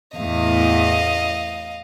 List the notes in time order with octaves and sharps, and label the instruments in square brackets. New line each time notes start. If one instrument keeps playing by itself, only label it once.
[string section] E2 A2 [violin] D#5 F5